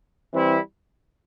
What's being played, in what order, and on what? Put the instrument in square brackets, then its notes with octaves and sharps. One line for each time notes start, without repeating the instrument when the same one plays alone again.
[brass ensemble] E3 G3 C4 E4